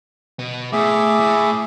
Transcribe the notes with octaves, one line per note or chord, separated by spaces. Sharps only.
B2 B3
A2 G#4 E5 D6
A2